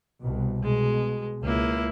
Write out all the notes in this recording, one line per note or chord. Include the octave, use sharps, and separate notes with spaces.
C2 B2
B2 G#3
C#2 A#3 E4